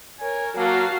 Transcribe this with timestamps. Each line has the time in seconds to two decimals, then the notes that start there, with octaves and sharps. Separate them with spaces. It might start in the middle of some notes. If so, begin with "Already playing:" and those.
0.19 A#4 C#5 G#5
0.57 F#3 A#3 F#4 F5 A5